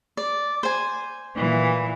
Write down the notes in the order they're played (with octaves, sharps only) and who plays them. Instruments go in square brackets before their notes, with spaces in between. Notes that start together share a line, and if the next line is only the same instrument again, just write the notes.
[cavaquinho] D5
C5 G#5
[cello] A#2 E3